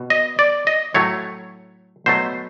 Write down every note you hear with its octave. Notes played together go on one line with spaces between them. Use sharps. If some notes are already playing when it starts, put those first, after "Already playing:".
Already playing: B2
D#5
D5
D#5
A2 F#3 A3 C#5
B2 F#3 A3 C5